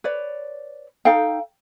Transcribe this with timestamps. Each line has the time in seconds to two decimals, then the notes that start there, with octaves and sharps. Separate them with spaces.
0.04 B4 C#5 D5
1.05 D#4 A4 F5 G5